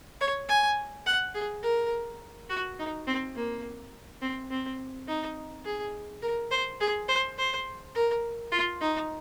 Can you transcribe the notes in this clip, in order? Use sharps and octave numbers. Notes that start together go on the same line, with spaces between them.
C#5
G#5
F#5
G#4
A#4
F#4
D#4
C4
A#3
C4
C4
D#4
G#4
A#4
C5
G#4
C5
C5
A#4
F4
D#4